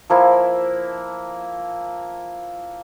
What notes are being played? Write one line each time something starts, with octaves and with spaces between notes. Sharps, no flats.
F3 A#3 E4